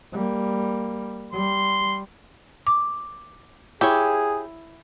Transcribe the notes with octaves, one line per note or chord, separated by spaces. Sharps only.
G3 A#3
G3 C6
D6
E4 G4 G#4 C#5